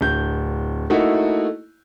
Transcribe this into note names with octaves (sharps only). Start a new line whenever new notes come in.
D1 G6
A3 A#3 D#4 E4 F#4